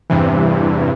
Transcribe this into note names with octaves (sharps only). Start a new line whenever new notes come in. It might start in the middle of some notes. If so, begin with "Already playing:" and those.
E2 G2 C3 E3